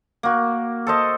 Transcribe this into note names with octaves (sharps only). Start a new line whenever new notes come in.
A#3 F#4
A4 C5 D#5